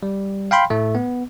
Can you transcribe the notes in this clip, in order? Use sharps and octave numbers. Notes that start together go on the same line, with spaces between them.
G3
F5 G5 B5 C6
A2 A3
B3